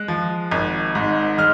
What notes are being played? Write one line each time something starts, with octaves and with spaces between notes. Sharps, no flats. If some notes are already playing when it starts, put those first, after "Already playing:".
Already playing: G#3 F#6
F3
G#1
G#2
G#3 F6